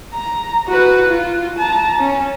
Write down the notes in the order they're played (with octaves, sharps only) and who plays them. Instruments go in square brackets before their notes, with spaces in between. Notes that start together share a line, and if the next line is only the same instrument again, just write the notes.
[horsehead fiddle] A#5
F#4 B4
F4
A5 A#5
C#4